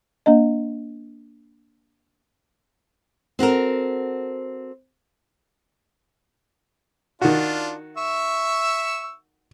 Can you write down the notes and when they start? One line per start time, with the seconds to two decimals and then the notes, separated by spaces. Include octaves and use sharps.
0.26 A#3 D4 D#5
3.39 C4 F#4 A4 A#4
7.21 D#3 D4 F4 F#4
7.97 E5 C#6 E6